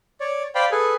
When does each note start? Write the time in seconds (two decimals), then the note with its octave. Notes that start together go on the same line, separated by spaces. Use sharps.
0.20 C#5 D5
0.55 C5 D5 F5 G5 B5
0.71 G#4 A4 B4 G#5